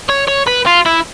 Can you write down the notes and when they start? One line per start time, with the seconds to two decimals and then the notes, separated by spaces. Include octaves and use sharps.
0.10 C#5
0.28 C#5
0.48 B4
0.67 F4
0.86 E4